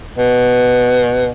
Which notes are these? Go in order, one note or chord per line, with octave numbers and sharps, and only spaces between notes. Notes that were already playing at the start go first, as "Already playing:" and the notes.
B2